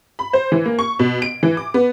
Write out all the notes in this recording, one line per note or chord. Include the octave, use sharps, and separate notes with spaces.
B5
C5
E3
A#3
C#6
B2
D7
E3
D6
B3